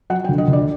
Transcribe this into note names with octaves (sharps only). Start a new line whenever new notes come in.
F#3 F#5
G5
D2
D#5
D2
D5